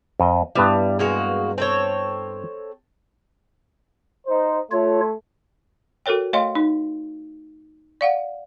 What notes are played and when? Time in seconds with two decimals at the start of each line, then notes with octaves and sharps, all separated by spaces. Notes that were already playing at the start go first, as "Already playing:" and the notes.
0.20 F2 D#5
0.55 G2 G3 B3 E4
0.99 G#3 A#3 F#4
1.58 C4 A4 C#5
4.27 D#4 C5
4.72 A3 F4 C#5
6.06 F#4 A4 A#4 C#5 G5
6.33 A3 C#5 D#5 F5 G5 C6
6.55 D#4
8.01 D5 F5 F#5